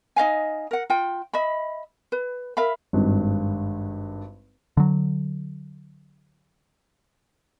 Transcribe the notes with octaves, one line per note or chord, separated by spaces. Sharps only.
D#4 D#5 F5 G#5
A#4 F#5
F4 G5
D#5 E5 B5
B4
A#4 E5 F5 B5
G#1 G2
D3 F#3